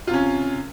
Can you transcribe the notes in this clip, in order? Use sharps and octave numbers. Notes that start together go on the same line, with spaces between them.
C3 C#4 F4